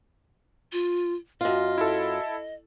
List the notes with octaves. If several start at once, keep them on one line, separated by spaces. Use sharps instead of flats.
F4
F#2 F4 D#5
E4 A4